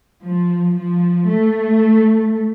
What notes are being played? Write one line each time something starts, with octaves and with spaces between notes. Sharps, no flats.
F3
F3
A3